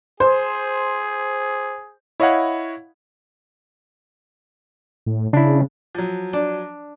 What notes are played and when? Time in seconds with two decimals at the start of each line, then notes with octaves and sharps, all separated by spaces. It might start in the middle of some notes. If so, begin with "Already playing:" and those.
0.20 G#4 C5
2.20 E4 C#5 D#5 F5 F#5 B5
5.06 A2
5.33 C#3 D4 E4
5.95 F3 F#3
6.33 D4